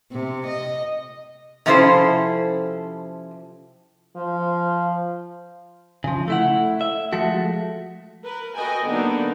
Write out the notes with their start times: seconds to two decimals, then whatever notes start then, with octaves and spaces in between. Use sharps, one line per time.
0.12 C3
0.47 D#5
1.66 C3 F3 C#4 E4 A4 C5
4.16 F3
6.04 C#3 F3
6.28 A3 E4 F#5
6.81 E5
7.13 F3 G#3 A3 F#4
8.25 A#4 B4
8.57 F#4 A4 B4 D#5 G5 G#5
8.86 D3 F#3 A#3 B3 D4 D#4